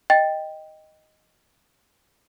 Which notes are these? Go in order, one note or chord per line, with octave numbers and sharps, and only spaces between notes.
D#5 G5 A6